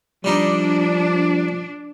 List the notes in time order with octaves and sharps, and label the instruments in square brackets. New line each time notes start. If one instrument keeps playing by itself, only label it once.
[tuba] F3 [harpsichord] G3 D#4 [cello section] D4